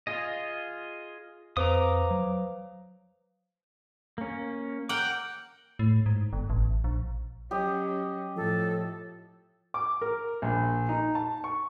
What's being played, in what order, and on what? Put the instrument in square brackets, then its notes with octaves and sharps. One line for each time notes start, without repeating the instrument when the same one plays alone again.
[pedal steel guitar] F4 G#4 D#5
[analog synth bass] F2 [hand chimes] B4 C5 F5 [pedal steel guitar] A#5 D6 D#6
[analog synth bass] F#3
[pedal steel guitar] A#3 C#4
[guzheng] A#4 F#5 G5 [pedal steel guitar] D6
[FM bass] A2
G#2
G1
A1
A#1
[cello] F#3 C#4 [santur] G4 D#5
[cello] A2 [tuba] F3 [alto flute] A4
[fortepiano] D6
A#4
A#1
D#4
A5
C#6